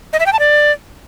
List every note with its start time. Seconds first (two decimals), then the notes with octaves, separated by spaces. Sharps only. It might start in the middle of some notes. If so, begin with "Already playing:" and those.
0.13 D#5
0.20 E5
0.26 G5
0.33 A5
0.39 D5